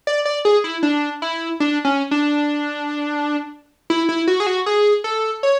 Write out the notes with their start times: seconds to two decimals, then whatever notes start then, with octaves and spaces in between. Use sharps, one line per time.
0.07 D5
0.25 D5
0.45 G#4
0.64 E4
0.83 D4
1.22 E4
1.60 D4
1.85 C#4
2.11 D4
3.90 E4
4.09 E4
4.27 F#4
4.40 G#4
4.47 F#4
4.66 G#4
5.04 A4
5.43 C#5